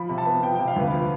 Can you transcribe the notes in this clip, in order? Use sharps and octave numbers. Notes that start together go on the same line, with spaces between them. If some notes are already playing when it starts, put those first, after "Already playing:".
Already playing: F3 B5
C3
A5
B3
F3 G5
C3 G5
F5
D2 B4
F3